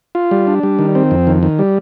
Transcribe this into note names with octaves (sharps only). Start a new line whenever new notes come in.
F4
G3
D4
G3
D#3
C4
F2
D#3
D#3
G3